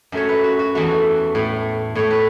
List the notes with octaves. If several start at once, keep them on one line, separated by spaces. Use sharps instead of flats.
F#2 F#3 A3 C#5
B4
F#4
F#4
E2 E3 A3 F#4
A2 A3
A2 A3 C#5
B4